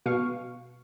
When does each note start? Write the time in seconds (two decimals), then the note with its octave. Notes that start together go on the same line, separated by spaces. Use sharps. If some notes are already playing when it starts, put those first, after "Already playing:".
0.06 B2 F5 C#6